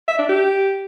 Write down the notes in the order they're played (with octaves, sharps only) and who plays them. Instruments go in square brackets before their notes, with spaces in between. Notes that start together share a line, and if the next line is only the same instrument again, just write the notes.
[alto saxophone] E5
D4
G4